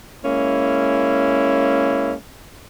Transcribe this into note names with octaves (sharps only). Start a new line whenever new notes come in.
G#3 A#3 C#4 E4